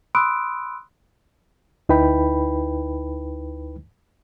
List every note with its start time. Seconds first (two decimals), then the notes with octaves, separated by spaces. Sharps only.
0.15 B5 C6 D#6 E6 F#6 D7
1.89 D2 D#4 E4 B4 G5 B5